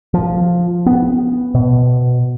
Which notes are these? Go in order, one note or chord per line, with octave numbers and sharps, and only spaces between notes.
F3
B3
B2